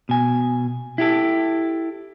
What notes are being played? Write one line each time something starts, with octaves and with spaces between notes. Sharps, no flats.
B2 G#5
E4 G4 A4